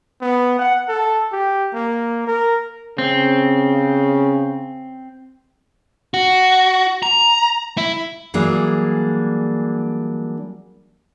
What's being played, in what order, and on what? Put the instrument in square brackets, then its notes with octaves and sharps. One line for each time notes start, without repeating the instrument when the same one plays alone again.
[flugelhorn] B3
F#5
A4
G4
A#3
A#4
[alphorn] C#3 [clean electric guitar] C4
[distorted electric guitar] F#4
A#5
E4
[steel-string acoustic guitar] E3 F#3 G3 A#3 D4 G#4